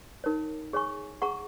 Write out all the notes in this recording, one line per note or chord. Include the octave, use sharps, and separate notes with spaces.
D#4 A#4 C#5
G#4 C#5 G#5 C#6
G#4 F#5 A#5 C#6